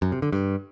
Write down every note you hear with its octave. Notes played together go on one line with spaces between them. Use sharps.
F#2
C3
D3
G2